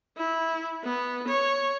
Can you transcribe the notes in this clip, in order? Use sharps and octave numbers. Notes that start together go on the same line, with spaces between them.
E4
B3
C#5